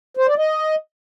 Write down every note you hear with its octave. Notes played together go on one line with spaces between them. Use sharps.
C5
D5
D#5